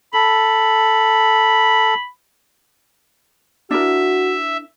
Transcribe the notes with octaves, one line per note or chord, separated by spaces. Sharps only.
A4 B5
D4 E4 F#4 A#4 E5